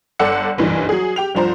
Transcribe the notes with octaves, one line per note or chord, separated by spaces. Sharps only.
G1 A4 D5 F#5 E6 C#7
F#1 B1 G2 E3
F#3 G#4
G4 G5 F7
C2 G2 F3 C5 A#5